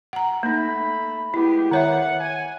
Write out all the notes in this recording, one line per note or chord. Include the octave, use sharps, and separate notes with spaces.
F#5 A#5
A3 A#3 D#4 B5
G#3 B3 E4 G4
D#3 C#5 E5 F#5
G#5